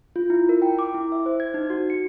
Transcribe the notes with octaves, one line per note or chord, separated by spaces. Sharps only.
F4
E4
A#4
G5
D6
E4
E5
C5
G#6
D#4
F#4
C#7